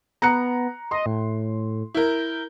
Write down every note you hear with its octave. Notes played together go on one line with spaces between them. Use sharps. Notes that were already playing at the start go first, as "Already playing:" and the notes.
B3 A#5 F#6 C#7
D#5 C6
A2
E4 A#4 G6